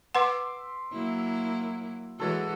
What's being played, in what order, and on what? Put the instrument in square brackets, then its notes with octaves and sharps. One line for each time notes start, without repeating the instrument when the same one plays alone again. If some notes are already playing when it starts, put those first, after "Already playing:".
[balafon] B4 F#5 [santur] E5 C6 D6
[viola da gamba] F#3 A#3 E4
[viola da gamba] E3 G#3 F#4 [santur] A4 C#5 E5